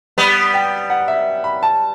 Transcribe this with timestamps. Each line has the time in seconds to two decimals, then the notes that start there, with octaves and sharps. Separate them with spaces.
0.18 G3 B3 B5
0.54 G5
0.90 F#5
1.08 E5
1.44 B5
1.63 A5